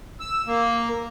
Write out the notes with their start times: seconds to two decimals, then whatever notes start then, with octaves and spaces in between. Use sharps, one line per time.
0.20 E6
0.46 A#3